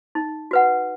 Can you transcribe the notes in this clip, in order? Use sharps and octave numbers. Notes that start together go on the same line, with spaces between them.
D#4
F#4 B4 F#5